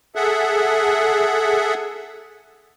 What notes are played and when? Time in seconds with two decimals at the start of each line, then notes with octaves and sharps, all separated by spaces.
0.15 G#4 A4 E5 F#5